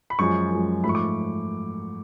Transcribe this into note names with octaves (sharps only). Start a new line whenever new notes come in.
B5
F#2 F3 G#3 C#6
F#2 F3 G#3
G#2 F3 A3 B5
C#6
D6